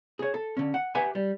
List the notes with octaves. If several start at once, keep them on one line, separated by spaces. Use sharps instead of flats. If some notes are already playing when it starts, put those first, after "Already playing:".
G#4 C#5
A4
D3 C#4
F#5
G4 B4 E5 F#5 G#5
G3